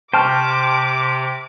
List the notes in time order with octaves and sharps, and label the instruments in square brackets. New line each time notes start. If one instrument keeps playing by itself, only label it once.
[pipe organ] C3 [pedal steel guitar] C5 G5 [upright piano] A5 C#6 F6 [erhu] D6